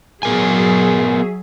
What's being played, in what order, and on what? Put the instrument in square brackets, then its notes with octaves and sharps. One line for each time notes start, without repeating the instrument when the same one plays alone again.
[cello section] F#3 G#4 E5 [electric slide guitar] B3 A#4 G#5